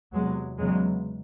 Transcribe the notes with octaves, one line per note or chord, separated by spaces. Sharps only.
E2 C3 F#3 G#3
E2 C#3 F#3 G#3